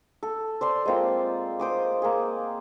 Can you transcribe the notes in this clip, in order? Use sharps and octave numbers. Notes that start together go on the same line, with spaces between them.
A4
C5 D5 C6
G#3 A#3 C4 F4
C5 D6 D#6
A#3 G#4